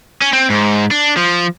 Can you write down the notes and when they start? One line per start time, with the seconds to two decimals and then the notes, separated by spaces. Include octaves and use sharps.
0.22 C#4
0.33 C4
0.50 G#2
0.91 D4
1.17 F3